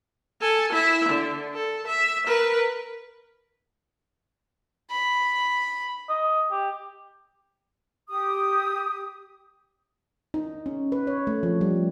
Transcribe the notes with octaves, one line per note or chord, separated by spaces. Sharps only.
A4 G#5
E4 E5
D3
A4
E5
A#4 B4
B5
D#5
G4
G4 D#6
D#4
C#4
B4
C#5
A3
F3
G3